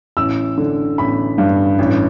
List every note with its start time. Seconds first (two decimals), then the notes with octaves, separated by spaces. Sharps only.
0.17 A1 E6
0.58 D3
0.98 A1 B5
1.38 G2
1.79 A1